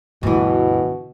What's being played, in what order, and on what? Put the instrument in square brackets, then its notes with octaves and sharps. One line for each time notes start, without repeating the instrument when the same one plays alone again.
[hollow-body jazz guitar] D2 E3 [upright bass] G2 [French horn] B2